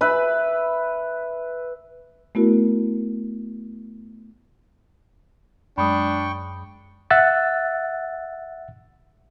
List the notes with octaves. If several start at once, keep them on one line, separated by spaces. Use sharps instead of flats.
B4 E5 B5
A3 B3 E4 F#4 A#4
F#2 G#3 D4 G5 B5 C#6 D#6
E5 F#5 E6 F#6 A6